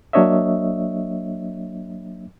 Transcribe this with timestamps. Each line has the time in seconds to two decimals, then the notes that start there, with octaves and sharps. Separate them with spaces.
0.13 F#3 A#3 D4 C#5 D#5 E5